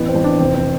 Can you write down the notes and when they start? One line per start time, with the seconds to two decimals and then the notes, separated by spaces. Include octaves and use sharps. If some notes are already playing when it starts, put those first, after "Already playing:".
Already playing: A1 B3
0.08 C4
0.15 A1
0.24 D4
0.39 F1 C4
0.55 C4